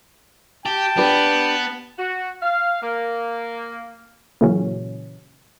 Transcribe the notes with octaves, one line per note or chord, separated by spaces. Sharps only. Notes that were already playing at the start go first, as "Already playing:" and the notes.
G4 G5 A5
B3 D4 G4 B4
F#4
F5
A#3
A#2 C#3 E3 F#3 C#4